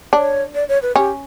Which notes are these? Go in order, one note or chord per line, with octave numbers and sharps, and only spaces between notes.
D4 C#5
D5
C#5
B4
C#4 G4